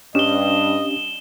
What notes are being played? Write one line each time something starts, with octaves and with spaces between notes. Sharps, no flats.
G2 C#4 D4 G4 D#5 E7 G7